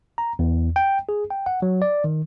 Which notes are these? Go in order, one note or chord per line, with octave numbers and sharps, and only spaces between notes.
A#5
E2
G5
G#4
G5
F#5
F#3
D5
D#3